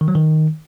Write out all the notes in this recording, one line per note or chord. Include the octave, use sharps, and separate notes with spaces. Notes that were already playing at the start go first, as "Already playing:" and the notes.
D#3
F#3
D#3